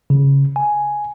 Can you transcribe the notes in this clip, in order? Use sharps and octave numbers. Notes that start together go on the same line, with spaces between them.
C#3
G#5